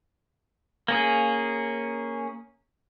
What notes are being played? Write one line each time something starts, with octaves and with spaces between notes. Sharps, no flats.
A#3 C#4 G#4